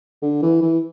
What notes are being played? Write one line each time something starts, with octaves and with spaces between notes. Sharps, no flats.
D3
E3
E3